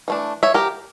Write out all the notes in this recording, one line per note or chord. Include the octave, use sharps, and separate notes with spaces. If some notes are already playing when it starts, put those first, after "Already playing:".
E3 A3 D4
C#5 E5
G4 A#4